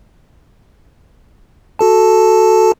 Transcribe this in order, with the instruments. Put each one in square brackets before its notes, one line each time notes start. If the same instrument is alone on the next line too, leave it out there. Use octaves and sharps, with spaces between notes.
[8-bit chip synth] F#4 A4 A5